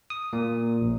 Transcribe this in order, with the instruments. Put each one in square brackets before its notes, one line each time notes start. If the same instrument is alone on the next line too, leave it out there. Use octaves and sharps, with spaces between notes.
[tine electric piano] D#6
A#2
A#1